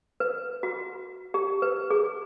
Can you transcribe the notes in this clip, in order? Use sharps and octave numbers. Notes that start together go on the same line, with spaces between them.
B4
F#4
G4
B4
G#4